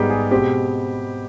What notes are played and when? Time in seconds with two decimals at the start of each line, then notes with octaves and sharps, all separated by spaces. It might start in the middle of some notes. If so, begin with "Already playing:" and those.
Already playing: G#2 G3 B3 G4
0.10 G#4
0.31 B2 G#3 C4 G4